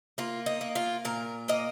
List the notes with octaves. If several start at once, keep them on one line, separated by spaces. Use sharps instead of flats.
A#3 F4
D#4
A#3
F4
A#2 A#4
A#3 D#5